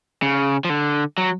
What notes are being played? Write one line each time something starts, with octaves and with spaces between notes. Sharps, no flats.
C#3
F3
D3
F#3